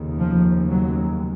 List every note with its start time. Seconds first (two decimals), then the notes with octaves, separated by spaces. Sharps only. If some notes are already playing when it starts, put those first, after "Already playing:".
Already playing: F1 D#2 C#3
0.18 F3
0.69 F#3